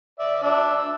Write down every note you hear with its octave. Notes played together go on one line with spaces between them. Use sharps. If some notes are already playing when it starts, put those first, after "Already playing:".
D5 E5
D4 E5
E6